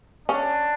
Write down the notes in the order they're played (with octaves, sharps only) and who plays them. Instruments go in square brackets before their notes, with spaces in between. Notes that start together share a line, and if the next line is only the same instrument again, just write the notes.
[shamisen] C#4 [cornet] D4